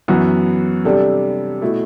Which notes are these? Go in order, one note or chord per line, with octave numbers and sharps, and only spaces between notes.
F#2 E3 B3 F#4
C3 G3 D4 A4
B2 A3 E4